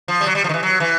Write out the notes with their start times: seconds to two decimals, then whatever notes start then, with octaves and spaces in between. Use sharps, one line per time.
0.08 F3
0.21 G3
0.27 F#3
0.35 G3
0.44 F3
0.49 D#3
0.54 E3
0.63 F#3
0.80 E3